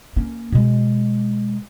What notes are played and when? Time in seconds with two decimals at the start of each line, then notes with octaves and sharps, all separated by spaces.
0.16 A#3 C#4
0.52 B2 G#3